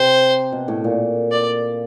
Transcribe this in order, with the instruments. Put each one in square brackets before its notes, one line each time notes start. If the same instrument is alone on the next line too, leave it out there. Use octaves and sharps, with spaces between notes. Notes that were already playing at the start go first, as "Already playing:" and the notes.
Already playing: [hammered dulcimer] C3 [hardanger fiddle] C5
[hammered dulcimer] B2
A2
A#2
[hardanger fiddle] D5